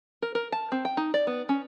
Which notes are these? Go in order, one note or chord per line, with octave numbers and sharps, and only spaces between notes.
A#4
A#4
A5
C4
G5
D#4
D5
B3
C#4